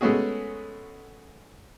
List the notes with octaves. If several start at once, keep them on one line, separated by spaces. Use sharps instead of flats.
G#3 A3 B3 C#4 F#4 G#4